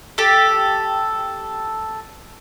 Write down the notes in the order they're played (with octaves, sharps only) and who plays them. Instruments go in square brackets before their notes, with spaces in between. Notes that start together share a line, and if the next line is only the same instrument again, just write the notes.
[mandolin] G4 A4